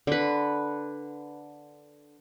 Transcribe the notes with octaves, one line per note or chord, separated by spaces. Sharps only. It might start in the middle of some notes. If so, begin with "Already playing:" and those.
D3 B4